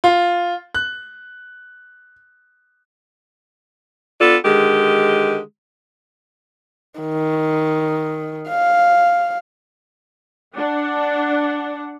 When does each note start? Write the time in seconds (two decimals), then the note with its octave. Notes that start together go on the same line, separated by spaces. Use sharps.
0.04 F4
0.75 F#6
4.20 B3 D4 F4 A4
4.45 D3 D#3 G#3 G4
7.00 D#3
8.49 F5
10.56 D4 F#5